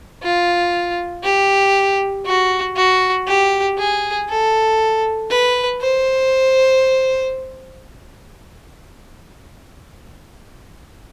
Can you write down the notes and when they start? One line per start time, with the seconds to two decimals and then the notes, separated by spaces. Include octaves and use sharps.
0.23 F4
1.24 G4
2.26 F#4
2.76 F#4
3.27 G4
3.78 G#4
4.29 A4
5.30 B4
5.81 C5